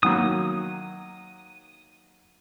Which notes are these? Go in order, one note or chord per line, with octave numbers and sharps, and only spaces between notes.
D#3 F#3 A#3 D#6